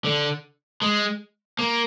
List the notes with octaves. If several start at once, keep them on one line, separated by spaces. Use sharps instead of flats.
D3
G#3
A#3